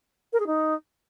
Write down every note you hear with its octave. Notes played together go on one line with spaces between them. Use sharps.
A#4
G#4
D#4